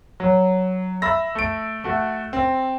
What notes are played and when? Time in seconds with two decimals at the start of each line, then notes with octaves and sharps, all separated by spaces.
0.20 F#3
1.02 E5 B5 E6 A#6
1.35 A3 D7
1.84 A3 F#4
2.33 C4